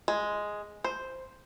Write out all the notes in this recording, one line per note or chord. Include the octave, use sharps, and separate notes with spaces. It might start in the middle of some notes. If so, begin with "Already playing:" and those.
G#3
C5